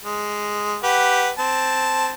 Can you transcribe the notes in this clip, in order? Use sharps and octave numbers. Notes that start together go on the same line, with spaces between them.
G#3
G4 B4 F#5
C4 A5